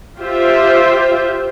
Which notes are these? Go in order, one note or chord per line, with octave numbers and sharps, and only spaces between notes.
F4 G4 C5 E5